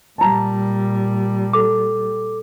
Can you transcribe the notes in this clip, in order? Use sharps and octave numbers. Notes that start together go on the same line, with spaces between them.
A#2 G3 A5 A#5
A4 D6